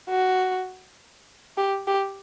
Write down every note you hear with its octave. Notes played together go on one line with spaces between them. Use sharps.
F#4
G4
G4